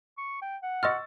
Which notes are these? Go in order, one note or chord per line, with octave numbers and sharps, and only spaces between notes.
C#6
G5
F#5
D#5 C6 C#6 E6 F6 A6